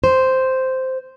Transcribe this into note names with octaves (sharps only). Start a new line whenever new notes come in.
C5